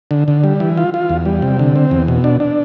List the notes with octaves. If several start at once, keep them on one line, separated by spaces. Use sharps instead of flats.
D3
D3
G3
E3
F4
F4
E2
G3
C3
D3
C4
E2
B2
D4
D4